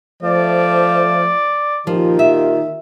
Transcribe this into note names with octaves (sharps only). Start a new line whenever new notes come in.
F3 A3 C5 D5
A#2 D#3 F3 F4 G4
E5